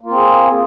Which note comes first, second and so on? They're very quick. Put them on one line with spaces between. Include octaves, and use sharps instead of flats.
A#3 F4 C4 G#4